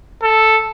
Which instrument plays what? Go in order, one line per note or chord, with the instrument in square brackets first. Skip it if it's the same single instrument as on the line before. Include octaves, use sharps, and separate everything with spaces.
[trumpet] A4